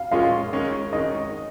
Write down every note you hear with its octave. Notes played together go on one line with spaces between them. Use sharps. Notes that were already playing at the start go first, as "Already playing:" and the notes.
Already playing: F5
A#2 G#3 C#4 F4 F5
D#3 G#3 C#4
D#3 G#3 C#4 D#5